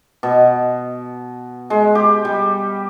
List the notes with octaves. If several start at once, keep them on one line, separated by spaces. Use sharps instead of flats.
B2
G#3
G4
G3